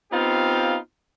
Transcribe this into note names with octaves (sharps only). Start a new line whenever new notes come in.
B3 C4 D#4 F4 G4 F5